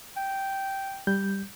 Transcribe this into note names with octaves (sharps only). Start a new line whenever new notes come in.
G5
G3 G6